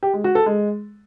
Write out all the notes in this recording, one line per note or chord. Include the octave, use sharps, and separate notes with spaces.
G4
G#3
F#4
A4
G#3